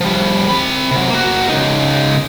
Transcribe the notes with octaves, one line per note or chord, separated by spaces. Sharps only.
F3 G3
C4 B5
C3 F#3
A#3 F#4
C#3 D#4